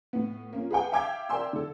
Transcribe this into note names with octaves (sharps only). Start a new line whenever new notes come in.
A2 B3
A#3 C#4 F4
G#4 B4 F#5 G5
E5 F5 G5 D6 G#6
A#4 D5 E5 G5 C6 E6
D3 A4